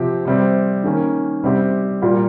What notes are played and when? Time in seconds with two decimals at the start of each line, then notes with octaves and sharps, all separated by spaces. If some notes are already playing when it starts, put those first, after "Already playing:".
Already playing: C3 F3 C4 G4
0.25 C3 G3 C4
0.84 D#3 A#3 C#4
1.44 C3 G3 C4 G4
2.02 A#2 G3 A#3